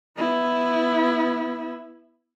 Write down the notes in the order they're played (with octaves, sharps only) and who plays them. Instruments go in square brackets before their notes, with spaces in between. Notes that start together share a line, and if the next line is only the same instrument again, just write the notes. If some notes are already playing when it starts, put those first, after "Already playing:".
[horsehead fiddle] B3 E4